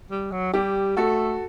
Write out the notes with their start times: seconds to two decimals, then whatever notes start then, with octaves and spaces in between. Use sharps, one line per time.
0.11 G3
0.32 F#3
0.53 G3 G4
0.97 A3 F#4 A4